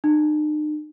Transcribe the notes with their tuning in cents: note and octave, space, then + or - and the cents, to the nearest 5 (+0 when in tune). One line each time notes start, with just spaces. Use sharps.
D#4 -45